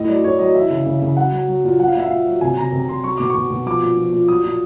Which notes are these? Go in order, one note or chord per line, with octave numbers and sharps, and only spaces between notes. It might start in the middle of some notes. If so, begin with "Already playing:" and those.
Already playing: A2 D#5
F#3 D5
A2 C#5
F#3 D#5
E3 E5
C#3
C#3
C#3
F#3 F#5
F#3
F#3
A#2
F#3 F#5
F5
A#2 E5
A#2 F5
F#3
C3 G#5
C3 A#5
C3
C3 C6
F#3 C#6
B2 D6
B2 C#6
B2
F3 D6
A#2
F3
A#2
F#3 D#6
A#2